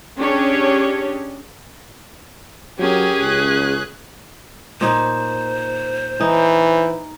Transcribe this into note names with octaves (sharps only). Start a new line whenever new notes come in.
C#4 D4 G4 G#4 C#5
F#3 C#4 G4 G#4 A#4
C#2 F#6
A#2 D#4 C5
E3 D#4